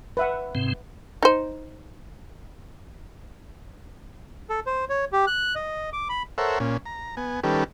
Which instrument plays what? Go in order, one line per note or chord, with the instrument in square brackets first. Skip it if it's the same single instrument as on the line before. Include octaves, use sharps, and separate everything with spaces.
[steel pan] B4 E5 F#5
[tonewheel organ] G#2 C3 C4
[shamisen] D#4 C5
[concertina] A4
C5
C#5
G4
F#6
D#5
D6
B5
[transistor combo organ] A4 A#4 C5 C#5 E5 F#5
A#2 C#4
A#5
B3 G#5
D#3 G3 C#4 G4 A4 B4